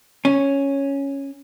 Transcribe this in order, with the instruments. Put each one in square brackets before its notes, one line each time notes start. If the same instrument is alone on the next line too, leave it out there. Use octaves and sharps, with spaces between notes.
[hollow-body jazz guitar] C#4